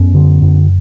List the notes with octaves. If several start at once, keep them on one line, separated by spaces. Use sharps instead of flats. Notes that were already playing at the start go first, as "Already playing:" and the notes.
Already playing: F#2 B3 C#4
D3
F#2